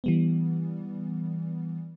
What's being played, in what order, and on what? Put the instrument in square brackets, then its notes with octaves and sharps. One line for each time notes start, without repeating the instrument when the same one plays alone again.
[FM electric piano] E3 G3 B3